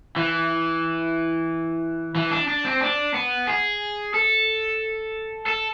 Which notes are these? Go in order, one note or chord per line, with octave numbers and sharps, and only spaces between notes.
E3
E3
D4
D4
C4
D4
B3
G#4
A4
A4